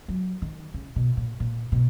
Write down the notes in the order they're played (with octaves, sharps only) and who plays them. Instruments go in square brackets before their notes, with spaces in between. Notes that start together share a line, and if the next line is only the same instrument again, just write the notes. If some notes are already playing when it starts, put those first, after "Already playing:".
[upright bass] F#3
D#3
C#3
B2
A#2
A#2
B2